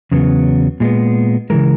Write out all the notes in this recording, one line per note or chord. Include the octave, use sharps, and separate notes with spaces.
E2 C#3 F#3 B3
A#2 G#3 B3
C#3 E3 G#3 A#4